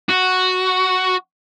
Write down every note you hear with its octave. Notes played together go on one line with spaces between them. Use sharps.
F#4